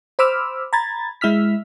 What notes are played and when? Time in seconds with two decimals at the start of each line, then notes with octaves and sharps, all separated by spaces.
0.19 C5 B5 D6 E6 F6
0.73 A#5 B5 G#6 A6
1.21 G#3 E4 E6 F6 B6